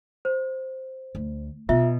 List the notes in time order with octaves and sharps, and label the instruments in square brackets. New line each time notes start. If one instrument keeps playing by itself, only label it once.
[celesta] C5
[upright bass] D2
[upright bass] B2 [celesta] F4 E5